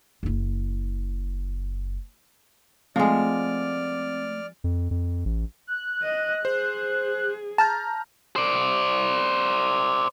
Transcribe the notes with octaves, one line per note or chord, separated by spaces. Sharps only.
F#1 E4
F3 G#3 A3 C4 D5 D6 F6
F2
F2
A1
F#6
D#5
G#4 C5
A5 A#5 F6 G6
C5 D5